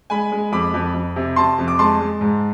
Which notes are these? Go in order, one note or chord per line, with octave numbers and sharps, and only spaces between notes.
G#3 G#5 B5
G#3
F2 B5 D6
F2
F2
C3
C3 A5 C6
F2
D6
G#3 A5 C6
G#3
G#2